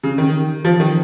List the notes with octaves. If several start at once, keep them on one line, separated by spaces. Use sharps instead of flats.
C#3
D#3
F3
D#3